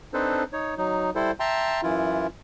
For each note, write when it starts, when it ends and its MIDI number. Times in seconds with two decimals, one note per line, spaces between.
0.14 0.43 60
0.14 0.43 62
0.14 0.43 63
0.14 0.43 69
0.14 0.43 71
0.14 0.43 72
0.53 0.74 63
0.53 0.74 73
0.77 1.10 54
0.77 1.10 63
1.15 1.31 55
1.15 1.31 64
1.15 1.31 69
1.15 1.31 72
1.40 1.81 76
1.40 1.81 79
1.40 1.81 81
1.40 1.81 82
1.40 1.81 84
1.83 2.27 42
1.83 2.27 52
1.83 2.27 64
1.83 2.27 65